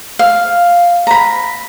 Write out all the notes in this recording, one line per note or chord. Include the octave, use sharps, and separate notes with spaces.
F5
A#5 B5